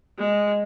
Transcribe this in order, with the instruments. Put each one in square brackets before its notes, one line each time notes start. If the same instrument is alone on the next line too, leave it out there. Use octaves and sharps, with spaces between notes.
[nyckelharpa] G#3